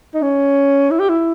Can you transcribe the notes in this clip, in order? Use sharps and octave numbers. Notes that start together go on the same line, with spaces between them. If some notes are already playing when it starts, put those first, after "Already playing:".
D#4
C#4
E4
G4
E4